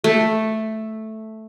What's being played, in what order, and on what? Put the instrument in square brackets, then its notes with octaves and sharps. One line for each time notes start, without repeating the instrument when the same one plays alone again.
[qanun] A3